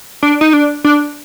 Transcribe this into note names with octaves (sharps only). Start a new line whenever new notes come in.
D4
D#4
D4
D4